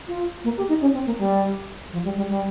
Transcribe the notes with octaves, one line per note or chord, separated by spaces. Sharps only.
F4
A#3
G4
D#4
C#4
C4
A#3
G3
F3
G3
G3
G3